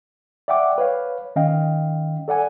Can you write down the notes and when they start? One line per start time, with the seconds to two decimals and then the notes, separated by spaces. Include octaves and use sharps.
0.48 D5 E5 F#5 G5 D6
0.78 B4 C#5 F5
1.36 D#3 C#4 D#5 F5 G5
2.28 A4 D5 F#5 G#5